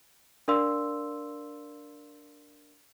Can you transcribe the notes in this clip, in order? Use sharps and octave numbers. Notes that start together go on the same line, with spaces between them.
D4 A#4 D5 F5 C6 E6